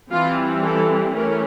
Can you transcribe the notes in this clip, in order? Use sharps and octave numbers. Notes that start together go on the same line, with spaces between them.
E3 G3 C4 F4
A4
E3 A3 C#4 A#4